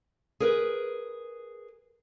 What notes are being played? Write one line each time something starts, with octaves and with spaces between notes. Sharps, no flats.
G#4 A#4 B4